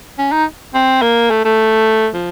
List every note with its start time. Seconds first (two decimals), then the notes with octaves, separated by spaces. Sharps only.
0.18 C#4
0.32 D#4
0.74 C4
1.02 A#3
1.31 A3
1.45 A3
2.14 F3